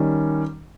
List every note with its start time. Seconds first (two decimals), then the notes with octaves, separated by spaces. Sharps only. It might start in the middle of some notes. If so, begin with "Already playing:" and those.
Already playing: D#3 G3 C#4